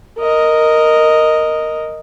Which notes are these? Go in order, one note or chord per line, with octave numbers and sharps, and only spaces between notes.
A#4 D#5